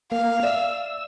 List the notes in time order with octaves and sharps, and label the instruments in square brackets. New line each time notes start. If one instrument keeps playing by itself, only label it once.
[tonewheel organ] A#3 [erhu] F5
[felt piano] D5 E5 [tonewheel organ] E6